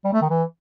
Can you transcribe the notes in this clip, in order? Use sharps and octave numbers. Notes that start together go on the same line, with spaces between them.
G3
A3
D#3
E3